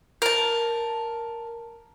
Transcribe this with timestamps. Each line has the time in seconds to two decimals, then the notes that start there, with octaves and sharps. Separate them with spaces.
0.22 A#4 A5